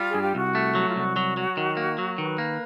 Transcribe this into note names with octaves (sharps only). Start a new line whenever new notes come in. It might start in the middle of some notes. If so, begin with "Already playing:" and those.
Already playing: G3 F4
G#4
G2
G4
C2 F#4
A3
F#3
F4
C2 F#4
F#3
F#3
D#3
A#3
F#3
D#3 B4
A#3